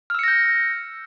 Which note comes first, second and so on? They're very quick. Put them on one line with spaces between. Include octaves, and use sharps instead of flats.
F6 E6 C#7 A#6 G6